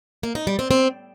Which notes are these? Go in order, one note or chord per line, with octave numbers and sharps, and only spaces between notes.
A#3
D#4
G3
C4
C4